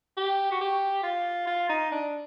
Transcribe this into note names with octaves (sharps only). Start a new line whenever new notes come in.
G4
F#4
G4
F4
F4
D#4
D4